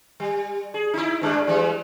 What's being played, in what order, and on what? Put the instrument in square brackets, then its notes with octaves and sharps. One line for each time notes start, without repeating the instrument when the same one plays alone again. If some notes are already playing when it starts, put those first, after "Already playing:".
[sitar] G3
G#4
D#4 E4
G2 G#3 D4
E3 G3 G#3